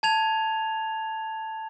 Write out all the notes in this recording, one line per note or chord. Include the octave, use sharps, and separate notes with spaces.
A5 G#6 F7